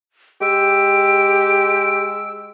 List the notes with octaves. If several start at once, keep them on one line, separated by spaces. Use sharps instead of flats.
G#3 G4 E6 D7